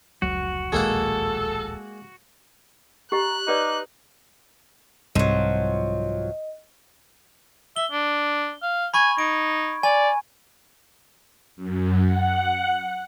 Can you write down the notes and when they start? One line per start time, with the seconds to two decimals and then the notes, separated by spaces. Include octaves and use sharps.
0.22 F1 C#2 F#3 F#4
0.72 D1 A#1 D#2 G#3 A#3 A4 F#5
3.12 G4 D#5 A#5 F#6
3.47 D#4 G4 B4 D5 D6
5.15 C2 G#2 F3 F#3 D#5
7.76 E5 G7
7.91 D4
8.62 F5
8.94 G#5 B5 C#6 G#6
9.18 D#4 D7
9.83 D5 G#5
11.56 F#2
12.06 F#5